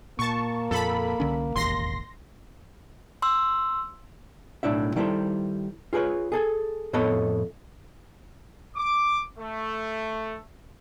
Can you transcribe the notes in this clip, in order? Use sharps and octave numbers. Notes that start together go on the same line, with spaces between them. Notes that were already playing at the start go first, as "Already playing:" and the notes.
A#2 A#3 A5 C#6
F2 A#2 A4 B5
C2 D3 C#4
E1 A1 D#2 C6 A#6
C6 E6
B1 A2 D4 E4 E5
D#3 G3 E4 G#4 A4 C5
F4 G#4 A#4 B4 C#5
G#4 A4 G#5
F2 A2 B3 A4 C#5 D#5
D6
A3